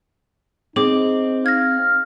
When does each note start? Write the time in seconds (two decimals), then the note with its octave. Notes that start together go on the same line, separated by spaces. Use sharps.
0.76 C4 D#4 G#4 D6
1.46 F5 G#6 A#6